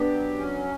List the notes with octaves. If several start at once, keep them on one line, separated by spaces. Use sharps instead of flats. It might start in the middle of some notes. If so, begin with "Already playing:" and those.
Already playing: B3 D4 G4
F#3
C#4